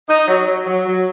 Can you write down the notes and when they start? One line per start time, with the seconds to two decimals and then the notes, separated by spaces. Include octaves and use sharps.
0.09 D#4
0.28 F#3
0.47 F#3
0.66 F#3
0.85 F#3